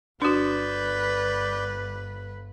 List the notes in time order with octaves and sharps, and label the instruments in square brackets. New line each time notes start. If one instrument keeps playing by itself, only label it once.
[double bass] G1 [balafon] D4 F#4 [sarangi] B4 [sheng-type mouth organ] D5 G6